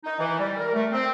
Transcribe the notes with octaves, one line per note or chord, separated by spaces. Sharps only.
D#4
E3
G3
A#4
A3
C4